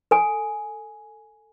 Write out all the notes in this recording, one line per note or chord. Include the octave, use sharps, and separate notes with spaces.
A4 G#5